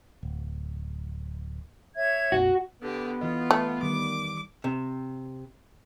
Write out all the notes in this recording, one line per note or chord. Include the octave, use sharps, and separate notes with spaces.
D1
C#5 E5 G#6
A#1 F2 F#4
D3 B3 G4
E3 F4 D#5
A3
D#3 G3 D6
C3